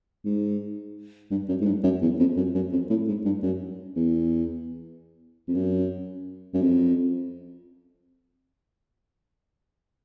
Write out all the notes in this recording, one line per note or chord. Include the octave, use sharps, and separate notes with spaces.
G#2
G2
F#2
G#2
G2
F#2
E2
F2
F#2
F#2
F2
A2
G#2
G2
F#2
E2
F2
F#2
F#2
F2